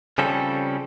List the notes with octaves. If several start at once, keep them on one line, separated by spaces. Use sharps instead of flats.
C#3 F3 G3 C4 C#4 A4